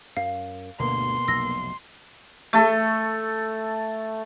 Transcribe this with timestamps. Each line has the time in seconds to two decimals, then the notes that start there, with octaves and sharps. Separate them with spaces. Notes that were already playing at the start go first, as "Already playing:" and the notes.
0.17 F#2 F5
0.80 D2 G2 B2 D3 A#3 C6
1.28 F1 B1 E6 A#6
2.53 A3 A4